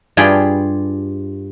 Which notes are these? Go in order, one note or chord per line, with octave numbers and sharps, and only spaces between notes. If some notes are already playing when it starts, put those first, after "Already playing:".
G2 F4 G#4 G5 B5